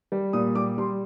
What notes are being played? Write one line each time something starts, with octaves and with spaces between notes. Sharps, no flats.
G3
A#2 D#6
G3 D6
G3 C6